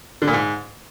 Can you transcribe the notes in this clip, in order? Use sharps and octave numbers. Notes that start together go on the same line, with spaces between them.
D3
A#2
G#2